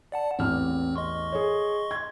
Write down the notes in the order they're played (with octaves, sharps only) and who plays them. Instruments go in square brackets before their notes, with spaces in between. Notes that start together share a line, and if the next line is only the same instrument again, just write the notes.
[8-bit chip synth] D5 F#5 A5
[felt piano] A1 E2 F6 [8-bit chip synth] C4
[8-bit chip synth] D#5 C6 C#6
[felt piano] G#4 C#5
G#6